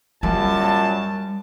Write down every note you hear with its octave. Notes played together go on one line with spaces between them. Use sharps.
F#2 A#2 G3 A5